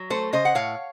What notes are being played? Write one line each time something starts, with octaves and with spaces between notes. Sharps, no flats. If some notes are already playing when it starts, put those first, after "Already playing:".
Already playing: F#3
A3 A4 C5
C#3 C5 D#5
F#5
A2 C#5 F5